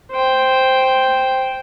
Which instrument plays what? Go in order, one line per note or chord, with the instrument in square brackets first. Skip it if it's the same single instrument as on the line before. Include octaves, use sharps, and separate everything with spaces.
[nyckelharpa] C5 G5